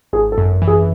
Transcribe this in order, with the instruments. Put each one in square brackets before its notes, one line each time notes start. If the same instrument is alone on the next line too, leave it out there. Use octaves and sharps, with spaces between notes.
[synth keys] G#1 [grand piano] G#4
[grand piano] A4
[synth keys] F#2
E3
[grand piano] G#4